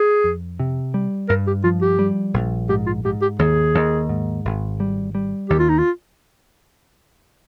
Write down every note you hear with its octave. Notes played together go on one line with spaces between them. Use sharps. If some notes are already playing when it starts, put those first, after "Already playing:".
Already playing: G#4
F2
C3
G3
G2 A#4
G4
F3 F4
G4
G3
A#1
G#2 G4
F4
G#2 G4
G4
D#2 G#4
D#2
G#2
G#1
G3
G3
D#2 G4
F4
D#4
F4